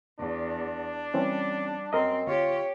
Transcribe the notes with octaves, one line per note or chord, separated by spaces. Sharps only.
E2 D4
E3 G3 C4 C#4
F#2 C4 A#4 D#5
D2 F4 G4 C#5